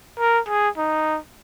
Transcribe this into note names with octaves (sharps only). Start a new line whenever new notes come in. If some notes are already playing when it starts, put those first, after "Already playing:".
A#4
G#4
D#4